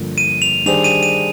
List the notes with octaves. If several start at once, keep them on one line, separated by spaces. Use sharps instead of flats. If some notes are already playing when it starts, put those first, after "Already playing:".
Already playing: G2 D3 F3 A#3
D#7
F7
D#3 G3 D4 G#4 C5 F7
D#7
D#7